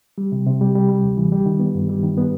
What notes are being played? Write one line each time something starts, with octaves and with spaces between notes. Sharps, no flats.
G3
C3
C3
G3
G3
G3
D2
E3
G3
D#3
B3
G2
G3
D#3
B3